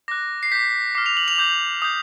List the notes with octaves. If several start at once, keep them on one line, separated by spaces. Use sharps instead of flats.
D6 F#6 A#6
C7
D6 G6 B6
D6 F6 C7
F7
F#7
F7
D6 G6
D#6 G6